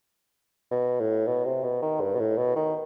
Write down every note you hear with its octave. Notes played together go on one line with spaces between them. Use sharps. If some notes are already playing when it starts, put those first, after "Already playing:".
B2
A2
B2
C3
B2
D#3
G2
B2
A2
B2
D#3